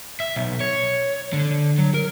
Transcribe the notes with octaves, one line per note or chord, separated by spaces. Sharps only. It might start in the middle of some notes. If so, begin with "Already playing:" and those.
E5
B1
C#5
D3
F#3
A#4